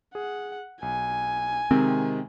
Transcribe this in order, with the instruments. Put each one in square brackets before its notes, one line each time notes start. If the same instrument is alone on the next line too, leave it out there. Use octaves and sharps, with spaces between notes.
[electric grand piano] G#4 [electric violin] F#5
[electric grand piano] B1 [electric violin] G#5
[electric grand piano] C3 D#3 G#3 [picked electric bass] C4